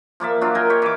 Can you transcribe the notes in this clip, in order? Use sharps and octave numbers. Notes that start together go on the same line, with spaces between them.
F3 A#3 D5 E5
F#3 D4 F4
A#4 D#5 G5 G#5
G4 C#5
E3 D6